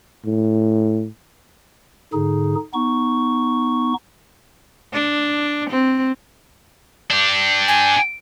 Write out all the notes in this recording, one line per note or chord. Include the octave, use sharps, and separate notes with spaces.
A2
G#2 D3 D#4 G#4
B3 D#4 C#6
D4
C4
D4 G4
G#5